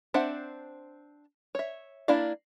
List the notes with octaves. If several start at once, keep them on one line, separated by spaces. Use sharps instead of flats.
C4 D4 C5 E5 F#5
C#5 E5
A#3 D4 E4 D5 F5